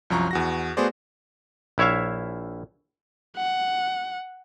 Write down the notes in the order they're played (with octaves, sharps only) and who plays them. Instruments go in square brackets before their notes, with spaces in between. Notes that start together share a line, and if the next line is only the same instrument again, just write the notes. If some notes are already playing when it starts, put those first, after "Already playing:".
[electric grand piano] C2 F#2 F3 A#5 C#6
E2 F#4 A#6
A3 B3 F#4 G#4 C5 D5
[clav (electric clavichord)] A#1 E4 C#5 E5 F5
[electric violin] F#5